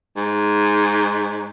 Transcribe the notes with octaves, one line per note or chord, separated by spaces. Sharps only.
G#2